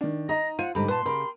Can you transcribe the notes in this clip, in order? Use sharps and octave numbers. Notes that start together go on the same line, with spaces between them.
D#3 D4
D#4 D#5 A#5 A#6
F4 C5 F#5 D#7
G#2 D3 G3 G4 A#5 B5
A#2 B4 A5 C6
C#3 G4 A#4 B5